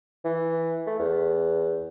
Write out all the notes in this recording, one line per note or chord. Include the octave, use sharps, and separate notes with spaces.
E3
A3
E2